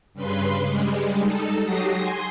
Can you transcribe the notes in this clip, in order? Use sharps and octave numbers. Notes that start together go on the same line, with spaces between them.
G2 C#3 B4 C6
G3 G#3
D#4 A4
F#3 F#4 G4 D#6 A#6 C7
G#5 C6